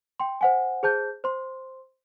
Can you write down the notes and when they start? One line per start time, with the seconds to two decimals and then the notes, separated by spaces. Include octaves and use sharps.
0.20 G5 C6
0.41 C5 F#5 G#5
0.83 G#4 C5 A5 G6
1.24 C5 C6